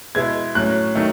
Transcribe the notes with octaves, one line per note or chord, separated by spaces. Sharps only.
B2 G#3 B3 E4 G#6
A2 F#3 C#4 F#6
D#3 F#3 A3